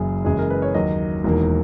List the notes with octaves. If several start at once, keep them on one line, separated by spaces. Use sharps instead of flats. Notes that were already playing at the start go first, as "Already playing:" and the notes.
Already playing: F#1 F#2 E3 G#4
F#2 C#3 E3 G#3 G#4
A#4
B4
C#5
D#2 D#3 F#3 A#3 D#5
E1 E2 D#3 A#3